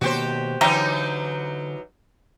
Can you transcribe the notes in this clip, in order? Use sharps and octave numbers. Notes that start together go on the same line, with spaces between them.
B2 D#3 A#3 F#4 G4 C5
D3 E3 F#3 D#4 E5 G5 A#5